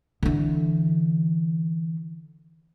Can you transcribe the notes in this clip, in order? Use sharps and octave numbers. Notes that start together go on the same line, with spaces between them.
D3 E3